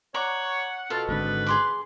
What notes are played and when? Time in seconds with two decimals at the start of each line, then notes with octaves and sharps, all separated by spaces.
0.14 C#5 D5 F#5 A#5 C#6
0.90 B2 F4 A4
1.09 G#1 G#2 D3 B4
1.46 G#4 C6 D6